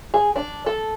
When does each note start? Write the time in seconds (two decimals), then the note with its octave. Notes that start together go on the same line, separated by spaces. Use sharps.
0.14 G#4
0.36 D4
0.66 A4